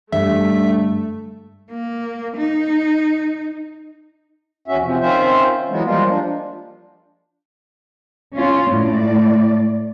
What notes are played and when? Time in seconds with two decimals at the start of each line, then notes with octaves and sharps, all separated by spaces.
0.12 G2 D3 A3 E5
1.71 A#3
2.37 D#4
4.68 E2 C#4 F#4 E5
4.82 C3 F3
5.01 D#3 C4 C#4 F4 C5 E5
5.70 E3 F#3 G#3 B3
5.85 F3 G3 G#3 A#3 F4
6.10 F3 D4
8.35 C#4 F4
8.70 A2 D5